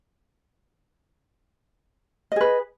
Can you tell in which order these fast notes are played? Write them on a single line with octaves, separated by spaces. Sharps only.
D#5 G#4 B4